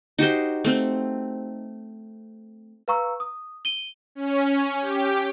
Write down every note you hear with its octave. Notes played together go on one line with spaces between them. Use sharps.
D#4 F#4 G4 C5
A3 C4
B4 F5 A#5 C#6 E6
D#6
D#7 G7
C#4
G4